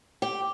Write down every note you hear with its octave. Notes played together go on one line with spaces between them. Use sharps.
G4